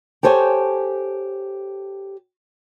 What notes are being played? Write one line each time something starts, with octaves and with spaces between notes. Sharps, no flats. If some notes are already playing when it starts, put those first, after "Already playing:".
G4 A4 C5 C#5 G#5